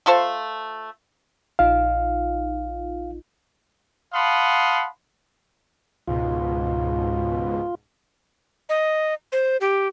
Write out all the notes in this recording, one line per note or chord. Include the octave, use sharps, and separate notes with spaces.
A3 F4 A4 C5
A#1 D#4 F4 F5
F5 F#5 A5 B5 C6 D#6
C#2 G#2 B2 F4
D#5
C5
G4